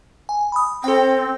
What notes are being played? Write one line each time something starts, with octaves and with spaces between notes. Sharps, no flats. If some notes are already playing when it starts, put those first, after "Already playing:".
G#5
B5 D#6
C4 A4 G5